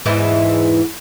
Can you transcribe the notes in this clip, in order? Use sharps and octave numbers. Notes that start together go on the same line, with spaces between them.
E2 G#2 E3